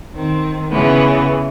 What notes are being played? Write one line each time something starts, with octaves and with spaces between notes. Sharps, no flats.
D#3 C4
C#3 E3 B3